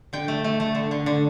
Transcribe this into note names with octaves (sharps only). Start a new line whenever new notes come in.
D3 G5
A3
A3
A3
D3
D3
D3